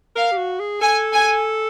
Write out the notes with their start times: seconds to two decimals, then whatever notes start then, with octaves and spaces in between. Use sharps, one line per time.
0.16 A#4 F5
0.32 G4
0.37 F#4
0.60 G#4
0.81 A4 G#5
1.14 G#5